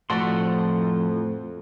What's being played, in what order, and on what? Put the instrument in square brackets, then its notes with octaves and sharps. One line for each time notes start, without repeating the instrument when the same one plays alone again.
[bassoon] F2 [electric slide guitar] A2 A5 [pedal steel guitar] F3 C6 [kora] A3 F#4 D5